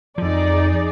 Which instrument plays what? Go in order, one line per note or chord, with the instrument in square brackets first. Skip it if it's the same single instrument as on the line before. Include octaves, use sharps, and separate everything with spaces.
[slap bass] F2 F3 [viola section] D#4 G#4 D5